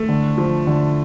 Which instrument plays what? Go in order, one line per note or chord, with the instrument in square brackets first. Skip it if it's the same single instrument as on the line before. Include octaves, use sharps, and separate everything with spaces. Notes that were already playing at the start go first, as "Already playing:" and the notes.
Already playing: [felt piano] A3
[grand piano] D3
F3
D3